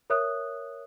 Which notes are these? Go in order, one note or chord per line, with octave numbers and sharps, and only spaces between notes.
A#4 C#5 E5 D#6 F#6